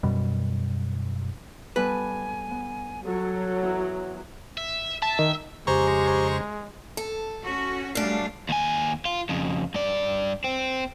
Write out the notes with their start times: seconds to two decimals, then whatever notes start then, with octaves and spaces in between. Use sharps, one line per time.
0.03 F#2 B2 G3
1.76 G3 B3 A4 B4 G#5
2.51 B3
3.04 F#3 A4
3.62 E2 E4 E6
4.57 E5
5.02 E5 A5
5.19 D#3
5.67 F2 C#3 G#3 G4 C5 G#5 A#5 C#6
6.97 A4
7.44 C#4 F#4
7.95 F#2 G3 A3 D4 F5
8.49 D#2 G#5
9.05 F4
9.29 F2 C#3
9.74 G2 D5
10.44 C4